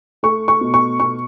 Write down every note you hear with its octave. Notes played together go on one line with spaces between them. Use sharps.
A3 C#6
C#6
B2
C#6
B2 C#6